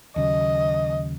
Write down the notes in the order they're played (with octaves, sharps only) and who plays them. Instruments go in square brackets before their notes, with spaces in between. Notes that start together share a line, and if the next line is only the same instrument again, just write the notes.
[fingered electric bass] D#2 C#3 F#3 [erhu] D#5